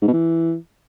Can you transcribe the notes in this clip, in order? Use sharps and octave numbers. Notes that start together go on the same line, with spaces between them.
G#2
B2
E3